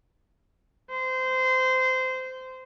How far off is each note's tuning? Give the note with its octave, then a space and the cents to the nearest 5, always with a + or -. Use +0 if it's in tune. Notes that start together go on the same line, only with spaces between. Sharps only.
C5 -20